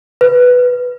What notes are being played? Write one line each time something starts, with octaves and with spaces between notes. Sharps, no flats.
B4